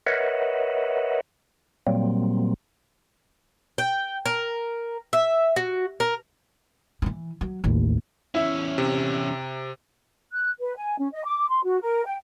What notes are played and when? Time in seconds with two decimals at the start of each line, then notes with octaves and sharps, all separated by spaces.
0.06 A#4 B4 C#5 D#5 E5 F#5
1.87 A#2 F#3 G3 A#3 C4
3.78 G5
4.26 A#4
5.13 E5
5.56 F#4
6.00 A#4
7.02 E3 F3
7.41 F#3
7.64 A1 D#2
8.35 E2 C#4 E4 E5
8.78 C3
10.32 F#6
10.60 B4
10.76 G#5
10.99 C#4
11.12 D#5
11.25 D6
11.50 C6
11.64 F#4
11.82 A#4
12.06 G5